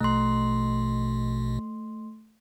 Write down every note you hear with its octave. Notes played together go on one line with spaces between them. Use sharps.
A#1 B2 A3 C6